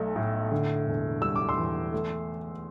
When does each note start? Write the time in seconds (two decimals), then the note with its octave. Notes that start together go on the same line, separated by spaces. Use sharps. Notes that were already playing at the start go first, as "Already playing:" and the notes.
Already playing: B1 F#3 A3
0.16 A2
0.52 D3
0.87 E1
1.22 G3 E6
1.36 D6
1.49 C6 E6
1.58 E2
1.93 A3